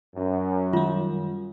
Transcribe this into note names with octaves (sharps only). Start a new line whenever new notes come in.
F#2
D#3 G3 F4